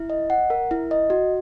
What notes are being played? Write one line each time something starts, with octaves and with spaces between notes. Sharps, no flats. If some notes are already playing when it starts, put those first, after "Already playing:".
Already playing: E4
D#5
F#5
A#4
E4
D#5
F#4